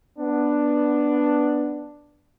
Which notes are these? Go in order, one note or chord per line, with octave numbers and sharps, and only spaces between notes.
B3 D4